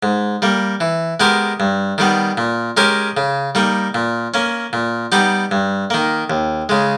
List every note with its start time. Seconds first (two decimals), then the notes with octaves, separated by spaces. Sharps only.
0.03 G#2
0.42 G3 A#3
0.81 E3
1.20 G#3 B3 G4 A#4
1.60 G2
1.98 D#3 G3 B3
2.37 A#2
2.77 G#3 C#4 G4 A#4
3.17 C#3
3.55 G3 A#3 D#4
3.94 A#2
4.34 A#3 C#4
4.73 A#2
5.12 G3 B3 D#4 G4
5.51 G2
5.90 D#3 A#3
6.30 D#2
6.69 C#3 G#3